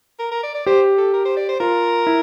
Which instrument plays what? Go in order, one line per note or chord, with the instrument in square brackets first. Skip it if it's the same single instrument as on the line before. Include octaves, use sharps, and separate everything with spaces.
[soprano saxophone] A#4
A#4
D5
D5
[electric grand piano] G4 [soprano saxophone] C5
[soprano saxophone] A4
A#4
C5
D5
C5
[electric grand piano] F4 [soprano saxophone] A#4
[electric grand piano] E4